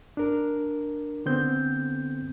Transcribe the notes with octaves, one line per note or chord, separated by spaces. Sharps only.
D4 A#4
D3 B3 C4 G6